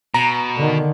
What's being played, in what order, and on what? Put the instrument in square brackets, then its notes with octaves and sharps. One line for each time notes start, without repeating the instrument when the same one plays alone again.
[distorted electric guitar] B2 [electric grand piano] A#5
[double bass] D3 D#3